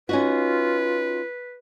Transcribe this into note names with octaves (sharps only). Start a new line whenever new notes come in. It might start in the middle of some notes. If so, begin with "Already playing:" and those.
C#4 D#4 F4 F#4 B4